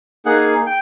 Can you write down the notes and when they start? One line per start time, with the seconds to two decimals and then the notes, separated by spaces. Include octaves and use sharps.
0.26 A#3 D#4 G#4 F#5
0.66 G5